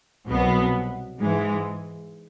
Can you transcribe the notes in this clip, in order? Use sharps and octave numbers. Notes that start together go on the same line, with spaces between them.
C2 B2 F#3 B3
G#2 E3 G#3